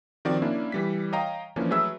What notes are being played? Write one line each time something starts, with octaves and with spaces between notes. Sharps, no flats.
D#3 F3 C4 F#4 D5
A#3 C#4 D4 E4
E3 G3 B6
C#5 D#5 F5 G5 A#5
E3 F3 A#3 C#4 D4
F#3 A3 G#4 B4 E5 E6